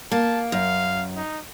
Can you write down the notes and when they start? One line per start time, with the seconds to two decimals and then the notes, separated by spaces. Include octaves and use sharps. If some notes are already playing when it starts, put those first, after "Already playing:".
0.11 A#3 A5
0.52 F#2 F5
1.16 D#4